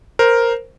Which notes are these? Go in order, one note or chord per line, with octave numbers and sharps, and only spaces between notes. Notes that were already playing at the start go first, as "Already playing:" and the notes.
A#4 C5